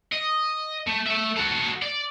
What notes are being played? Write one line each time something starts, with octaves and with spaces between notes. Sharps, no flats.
D#5
A3
A3 E5
F#4 A4
D5